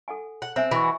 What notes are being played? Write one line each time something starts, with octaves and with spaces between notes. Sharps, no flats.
A4 F#5 G#5
F#5
C4 C5 E5 G#5
E3 F#4 D#5 C#6
G#5